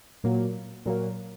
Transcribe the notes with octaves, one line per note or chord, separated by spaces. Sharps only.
A#2 F#3 A#3
A#2 F#3 A#3